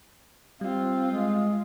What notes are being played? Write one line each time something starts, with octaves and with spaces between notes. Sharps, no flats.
G3 C4 F4
G#3